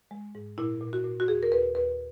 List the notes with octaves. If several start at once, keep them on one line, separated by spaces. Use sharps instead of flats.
G#3
G#2
A#2 E4
A#2
F#4
A#2
F#4
D#2 G#4
A#4
D#2 B4
D#2 B4